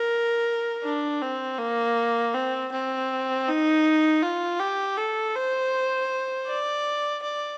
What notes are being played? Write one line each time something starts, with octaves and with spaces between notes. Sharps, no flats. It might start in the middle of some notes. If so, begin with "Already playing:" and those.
Already playing: A#4
D4
C4
A#3
C4
C4
D#4
F4
G4
A4
C5
D5
D5